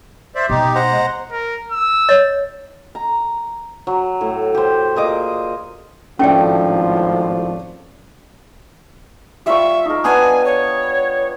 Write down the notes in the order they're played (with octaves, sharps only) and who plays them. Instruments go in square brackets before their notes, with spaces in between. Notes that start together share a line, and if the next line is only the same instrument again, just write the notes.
[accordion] C5 D5 E5
[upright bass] B2 [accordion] D#4 G4
[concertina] C5 F#5 A#5
[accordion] G#3
[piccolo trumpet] A#4
E6
[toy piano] C#5 D#5
[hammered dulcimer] A#5
F#3
A2
G4 C5
A#2 G#4 D#5 D6
[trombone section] G#1 A2 F3 [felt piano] A3 D4 [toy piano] C#4 G5 G#5
[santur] G3 F4 C#6 [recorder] E5
[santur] D#4 A#4
[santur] B3 D4 [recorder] G#5
[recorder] C#5